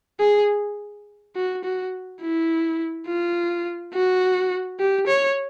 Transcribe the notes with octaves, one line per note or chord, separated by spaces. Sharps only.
G#4
F#4
F#4
E4
F4
F#4
G4
C#5